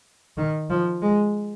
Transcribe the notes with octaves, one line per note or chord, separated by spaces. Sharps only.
D#3
F3
G#3